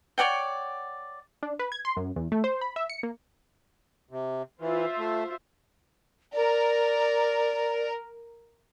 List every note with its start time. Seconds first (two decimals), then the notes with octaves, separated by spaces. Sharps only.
0.18 C#5 D5 F#5 G5
1.43 D4
1.59 B4
1.72 G#6
1.85 C6
1.96 F#2
2.16 E2
2.32 A3
2.44 C5
2.61 B5
2.76 E5
2.90 C#7
3.03 A#3
4.11 C3
4.61 E3 F4 C5 E5
4.98 A3
6.33 A#4 D5